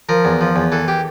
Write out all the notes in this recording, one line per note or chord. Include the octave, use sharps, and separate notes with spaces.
F3 A#4
E2
F3
E2
E3 A4
G4